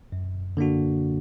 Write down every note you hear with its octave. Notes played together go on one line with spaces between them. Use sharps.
F#2
D3 A#3 D4 F#4